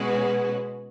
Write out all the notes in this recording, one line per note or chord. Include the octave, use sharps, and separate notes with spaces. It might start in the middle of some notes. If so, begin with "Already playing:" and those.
Already playing: B2 G#3 C#4 F#4 B4